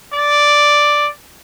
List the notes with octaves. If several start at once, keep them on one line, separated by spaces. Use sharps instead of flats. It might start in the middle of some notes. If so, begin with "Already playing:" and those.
D5